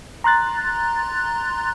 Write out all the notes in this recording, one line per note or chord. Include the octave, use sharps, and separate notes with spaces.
A#5 C6 F#6 A6